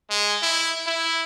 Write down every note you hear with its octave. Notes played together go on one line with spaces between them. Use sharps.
G#3
E4
E4